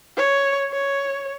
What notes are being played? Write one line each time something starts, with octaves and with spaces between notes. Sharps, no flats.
C#5
C#5